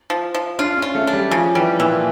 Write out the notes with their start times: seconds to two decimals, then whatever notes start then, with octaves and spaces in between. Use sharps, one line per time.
0.10 F3
0.34 F3
0.59 D4 F4
0.77 C#4
0.82 F4
0.95 A3
1.07 D4
1.13 G3
1.31 C#3 F3
1.55 E3 G3
1.79 A#2 E3